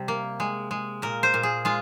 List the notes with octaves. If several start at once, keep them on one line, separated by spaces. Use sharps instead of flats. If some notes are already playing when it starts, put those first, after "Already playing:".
Already playing: C3 G3
A#3
G#3
G#3
A#2 A#4
C5
A#2
G#4
G#3 F4